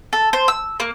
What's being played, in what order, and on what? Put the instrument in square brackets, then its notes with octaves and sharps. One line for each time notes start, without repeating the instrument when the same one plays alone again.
[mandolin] A4
C5
E6
A#3